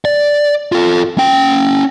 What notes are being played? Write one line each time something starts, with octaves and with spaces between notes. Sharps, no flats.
D5
F4 A4
C#4 G5